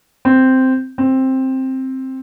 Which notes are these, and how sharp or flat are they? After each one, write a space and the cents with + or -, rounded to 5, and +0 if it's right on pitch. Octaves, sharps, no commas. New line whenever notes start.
C4 -5
C4 +10